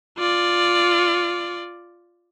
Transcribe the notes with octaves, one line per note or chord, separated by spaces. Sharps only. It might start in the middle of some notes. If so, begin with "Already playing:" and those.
F4 D5